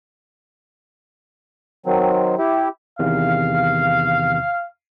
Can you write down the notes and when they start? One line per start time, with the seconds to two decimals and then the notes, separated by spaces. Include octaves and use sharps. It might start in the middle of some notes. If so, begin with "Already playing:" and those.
1.86 D#3 F#3 C4
2.38 E4 G4
2.99 E2 C3 D#3 F5